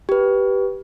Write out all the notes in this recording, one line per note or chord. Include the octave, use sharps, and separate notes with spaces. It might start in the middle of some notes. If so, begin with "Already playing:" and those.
G4 B4